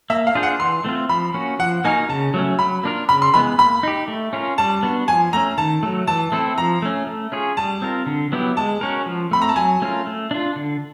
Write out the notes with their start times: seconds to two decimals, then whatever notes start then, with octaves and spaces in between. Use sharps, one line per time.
0.10 A#3 E5
0.27 F5
0.35 D4 F4 G#4 C5
0.43 F#5
0.59 E3 C6
0.84 A3 C4 F4
1.09 F3 B5
1.34 A#3 C#4 F#4
1.59 F3 F#5
1.84 A#3 D#4 F#4 A#4 G#5
2.09 C#3 A5
2.34 F#3 A3 C#4
2.59 F#3 B5
2.83 A#3 D4 F4 A#4
3.09 C#3 B5
3.22 C6
3.34 E3 G#3 B3 B5
3.58 A#3 B5
3.83 D#4 G4
4.08 A3
4.33 C#4 F4 A#4
4.58 G3 A5
4.83 B3 D4 F#4
5.08 F3 G#5
5.33 A3 C#4 A#5
5.58 D#3 A5
5.83 F#3 A3
6.07 E3 A5
6.32 A3 C4 E4 A4
6.58 F3 A#5
6.82 A3 C#4
7.07 A3
7.32 C#4 F4 G#4 C#5
7.57 G3 A5
7.82 C4 F4 A#4
8.06 D3
8.32 F#3 B3 E4 G4
8.57 G#3 A5
8.81 C#4 F#4 A#4
9.06 F3
9.31 A3 C4 B5
9.42 A#5
9.49 A5
9.56 F#3 G#5
9.82 A3 C#4 F4 A#4
10.07 A3
10.31 D4 F4
10.56 D3